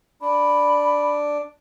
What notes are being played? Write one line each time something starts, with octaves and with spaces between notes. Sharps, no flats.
D4 B5